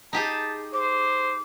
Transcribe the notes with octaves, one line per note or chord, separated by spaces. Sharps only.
D#4 G4 G#4 A5
C5 D6